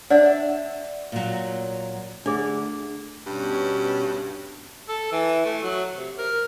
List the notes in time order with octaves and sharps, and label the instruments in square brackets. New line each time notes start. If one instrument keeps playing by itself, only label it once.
[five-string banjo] D4 [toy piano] D5 F#5 [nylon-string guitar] E5
[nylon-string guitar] A#2 F#3
[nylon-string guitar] D2 [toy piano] D4 G#4
[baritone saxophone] G2 [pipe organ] B2 C#4
[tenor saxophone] A4
E3
A3
F#3
C3
A#4